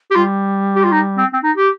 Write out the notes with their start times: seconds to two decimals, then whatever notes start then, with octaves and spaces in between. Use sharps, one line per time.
0.11 G4
0.15 G3 F4
0.76 G4
0.84 F4
0.92 D#4
1.18 C4
1.33 C4
1.43 D#4
1.57 G4